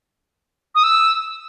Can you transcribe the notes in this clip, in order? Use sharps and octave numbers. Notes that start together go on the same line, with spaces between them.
D#6
E6